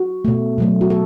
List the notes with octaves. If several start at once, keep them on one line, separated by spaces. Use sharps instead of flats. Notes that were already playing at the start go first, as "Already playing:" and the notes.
Already playing: F#4
B2 A3
B2 F#3 A3
F#4
A4